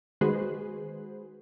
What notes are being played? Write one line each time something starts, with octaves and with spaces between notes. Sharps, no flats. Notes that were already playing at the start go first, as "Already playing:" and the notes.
D#3 G#3 F#4 G#4 B4 C5